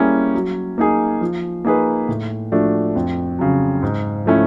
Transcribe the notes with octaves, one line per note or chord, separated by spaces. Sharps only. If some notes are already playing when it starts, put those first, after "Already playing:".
Already playing: G3 A#3 C#4 E4 G#4
F#3
A#3 D#4 G#4
F3
A#3 D#4 G#4 B4
A2
F3 A3 D4 F#4
F2
C#3 F#3
G#2
F3 A3 C#4 E4